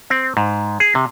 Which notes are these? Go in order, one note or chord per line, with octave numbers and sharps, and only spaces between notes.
C4
G#2
G#4
C3